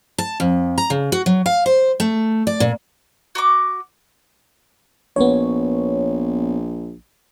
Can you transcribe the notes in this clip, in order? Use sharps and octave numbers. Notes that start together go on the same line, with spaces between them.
A5
F2
A#5
C#3
F#4
F#3
F5
C5
A3
D5
A#2
F#4 C#6 D6
A#1 B3 C#5